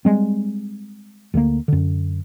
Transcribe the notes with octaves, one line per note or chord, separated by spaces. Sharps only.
G3 G#3 C4
D2 D3 D#3 A#3
F#2 D3